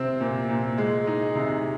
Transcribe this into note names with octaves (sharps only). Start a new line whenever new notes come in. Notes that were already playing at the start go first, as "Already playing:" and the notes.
Already playing: C3 C4
A#2
A#2
G#3
D#4
C3